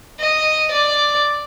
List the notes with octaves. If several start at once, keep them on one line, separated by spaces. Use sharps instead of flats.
D#5
D5